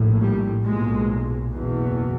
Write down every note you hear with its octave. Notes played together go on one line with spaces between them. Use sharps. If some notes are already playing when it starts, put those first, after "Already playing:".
Already playing: A#1 A2
G3
B1 A#2 G#3
F#1 E2 B2